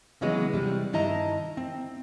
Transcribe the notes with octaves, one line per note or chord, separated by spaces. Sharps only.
C#3 E3 F#3 G#3 B3
C3 G3
G2 D#3 E4 D#5 A5 A#5
C4